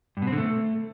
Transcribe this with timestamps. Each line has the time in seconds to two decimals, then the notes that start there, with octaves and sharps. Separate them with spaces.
0.17 G2
0.22 B2
0.27 C4
0.32 D3
0.38 A3